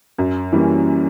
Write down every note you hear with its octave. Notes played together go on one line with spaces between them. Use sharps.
F#2
E3 G3 A#3 C#4